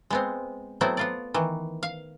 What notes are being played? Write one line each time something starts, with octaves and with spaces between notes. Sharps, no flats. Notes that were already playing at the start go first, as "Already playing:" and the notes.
G#3 B3 C4
F#3 A3 B3 C4 E4
B3 F4 D5
D#3 E3
F5